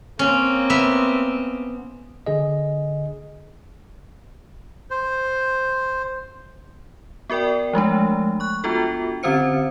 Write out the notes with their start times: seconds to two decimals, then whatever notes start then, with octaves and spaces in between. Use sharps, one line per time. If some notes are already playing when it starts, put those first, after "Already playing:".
0.19 A#3 C4 C#4
0.70 B3 E5
2.26 D3 G#4 D#5
4.90 C5
7.30 B3 F#4 A#4 D5 G5
7.73 F3 G#3 A3 D4
8.40 C#6 F#6
8.64 B3 D4 F4 F#4 A4
9.23 D3 C4 C#4 C5 C#7